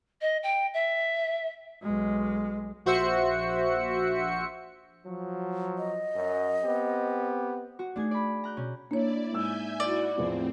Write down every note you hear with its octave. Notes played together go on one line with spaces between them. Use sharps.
D#5
G5
E5
B1 G#3
A#1 F#4 C5 E5 C#7
F3 F#3
D#5
F#2
B3 C4 G4
F#4
A3 D4 D#4 G#4 G#6
D5 B5
A#5 F#6 G6
B2 C#4
A#3 D4 E4 C#5 D5
G#2 E5 G#5 E6 G6
E4 F#4 D5
E2 A2 F3 C4